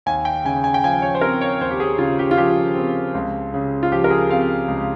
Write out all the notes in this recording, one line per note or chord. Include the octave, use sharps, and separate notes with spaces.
D#2 G#5
G5
C#3 G#5
G#5
G5
F3 G#5
C#5
C5
C4 A#4
C#5
D#2 C5
G4
G#4
C#3 F4
G4
F4
F3 G4
C4
C#2
C#3
F4
F3 G4
A#4
G#4
C4 F5
C#2